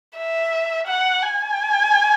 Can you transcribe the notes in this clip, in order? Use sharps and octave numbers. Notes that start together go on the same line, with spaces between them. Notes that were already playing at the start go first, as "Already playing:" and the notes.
E5
F#5
G#5